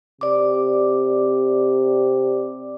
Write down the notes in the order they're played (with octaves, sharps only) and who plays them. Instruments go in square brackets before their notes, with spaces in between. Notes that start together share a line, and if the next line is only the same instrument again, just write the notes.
[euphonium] C3 [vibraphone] D5 D6